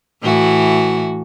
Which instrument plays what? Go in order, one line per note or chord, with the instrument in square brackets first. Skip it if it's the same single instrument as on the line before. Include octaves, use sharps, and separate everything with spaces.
[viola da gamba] A2 E3 F#4